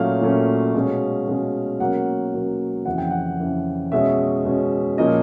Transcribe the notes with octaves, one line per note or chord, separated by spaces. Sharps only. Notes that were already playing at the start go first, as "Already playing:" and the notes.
Already playing: A#2 F#3 A3 C#4 F5
A#2 F#3 A3 C#4
B2 G#3 C#4
B2 G#3 C#4
B2 F#3 A#3 C#4 F#5
B2 F#3 A#3 C#4
F2 C#3 E3 F#5
G5
F#5
F2 C#3 E3
B2 G#3 C#4 E5
B2 G#3 C#4
A#2 F3 A#3 C#4 D#5